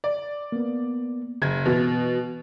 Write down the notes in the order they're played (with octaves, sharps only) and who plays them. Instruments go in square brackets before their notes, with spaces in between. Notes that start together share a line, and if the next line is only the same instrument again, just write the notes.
[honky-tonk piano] D5
[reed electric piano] A#3 B3
[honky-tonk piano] F#1 G#6
[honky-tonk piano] B2 [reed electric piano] E3 A6